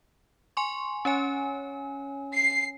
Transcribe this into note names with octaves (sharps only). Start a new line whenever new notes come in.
G#5 C6 C#6
C#4 C#5 G#5
C7